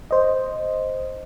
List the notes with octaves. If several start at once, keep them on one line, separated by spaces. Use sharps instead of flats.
C5 D#5